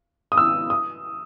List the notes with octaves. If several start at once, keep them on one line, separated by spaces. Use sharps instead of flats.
D#6
E6
D#6